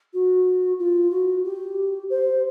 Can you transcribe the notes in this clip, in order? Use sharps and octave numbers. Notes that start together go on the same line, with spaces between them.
F#4
F4
F#4
G4
C5